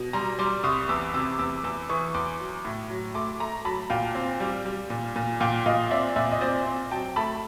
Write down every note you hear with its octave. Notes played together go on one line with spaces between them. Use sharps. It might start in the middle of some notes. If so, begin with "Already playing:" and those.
Already playing: B2
G3 A#5 C6
G3 C6 D6
C2 C#6 D#6
E2 D6 E6
C3 D6 E6
E2 D6 E6
E2 D6 E6
E3 C#6 D#6
E2 C6 D6
F#3
A2
F#3
A3 C6 D6
A3 A#5 C6
F#3 A5 B5
A#2 F5 G5
C4
G3
G3
A#2
A#2
A#2 F5 G5
A#2 D#5 F5
C4 D5 E5
A#2 D5 E5
D#5
C4 C5 D5
C4
F#3 G5 A5
A3 A5 B5